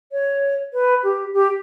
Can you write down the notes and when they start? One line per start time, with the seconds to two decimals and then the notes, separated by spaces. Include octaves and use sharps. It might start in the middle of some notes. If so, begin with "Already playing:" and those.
0.12 C#5
0.73 B4
1.03 G4
1.33 G4